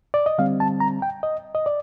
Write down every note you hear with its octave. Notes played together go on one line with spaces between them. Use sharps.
D5
D#5
D3 G3 C4 F5
A5
A#5
G5
D#5
D#5
D5